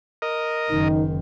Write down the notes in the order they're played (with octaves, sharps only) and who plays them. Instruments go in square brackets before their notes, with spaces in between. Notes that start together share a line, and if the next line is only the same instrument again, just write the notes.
[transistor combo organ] A#4 D#5
[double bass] F#1 D#3 [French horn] D#4